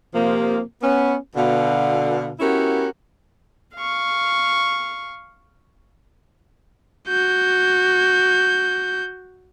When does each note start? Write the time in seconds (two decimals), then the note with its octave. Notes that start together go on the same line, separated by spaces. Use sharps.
0.14 C3 F3 A#3
0.83 B3 C#4
1.36 B2 D3 F5
2.40 B3 C#4 E4 F#4 G4 A#4
3.75 F5 C#6
7.08 F#4 G6